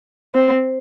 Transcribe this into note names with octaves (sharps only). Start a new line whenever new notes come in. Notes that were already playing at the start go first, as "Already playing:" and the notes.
C4